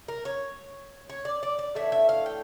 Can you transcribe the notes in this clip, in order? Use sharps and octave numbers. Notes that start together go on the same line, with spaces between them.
A#4
C#5
C#5
D5
D5
D5
A2 E3 A3 D4 E5
E5
F5
G5